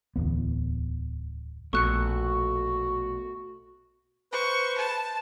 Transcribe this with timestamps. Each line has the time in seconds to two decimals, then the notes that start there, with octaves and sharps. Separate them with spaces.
0.16 D1 E2 B3
1.73 A#1 B2 A3 F#4 C#6 F#6 C#7
4.33 B4 C5 C#6
4.78 A5